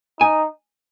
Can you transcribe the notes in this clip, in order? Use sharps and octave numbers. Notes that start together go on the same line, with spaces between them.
D#4 G#5